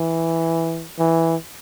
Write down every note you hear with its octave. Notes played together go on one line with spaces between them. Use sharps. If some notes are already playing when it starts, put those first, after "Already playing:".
Already playing: E3
E3